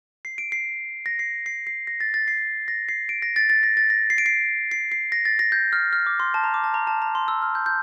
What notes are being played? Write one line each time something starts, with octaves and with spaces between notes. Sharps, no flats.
C7
D7
C7
A#6
C7
C7
C7
A#6
A6
A6
C7
A#6
C7
D7
A#6
A6
A6
A#6
A6
A#6
C7
D7
C7
C7
C7
A#6
A6
A#6
G6
F6
F6
D6
C6
A5
A#5
D6
A5
A#5
A5
A#5
C6
E6
F6
G6
G6